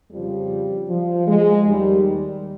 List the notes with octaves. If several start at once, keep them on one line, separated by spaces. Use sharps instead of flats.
F2 C#3 F3 G3
F3
G#3
D#2 D#3 G3